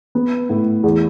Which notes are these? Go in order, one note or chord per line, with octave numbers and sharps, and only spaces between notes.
B3
A2
E2